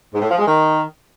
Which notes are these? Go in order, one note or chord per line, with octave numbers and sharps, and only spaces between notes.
G#2
A2
F3
G#3
D#3